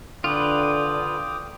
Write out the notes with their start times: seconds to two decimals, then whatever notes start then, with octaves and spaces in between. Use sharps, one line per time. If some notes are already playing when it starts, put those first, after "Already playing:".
0.24 D3 F4 B4 G5 D6 D#6